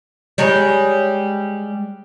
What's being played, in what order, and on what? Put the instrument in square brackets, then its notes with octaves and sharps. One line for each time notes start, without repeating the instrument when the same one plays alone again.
[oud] G3 G#3 C#5